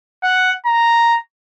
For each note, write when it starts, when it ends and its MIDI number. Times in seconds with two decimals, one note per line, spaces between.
0.23 0.51 78
0.66 1.16 82